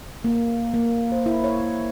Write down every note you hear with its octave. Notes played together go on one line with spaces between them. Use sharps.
A#3
A#3
C5
E4
C#5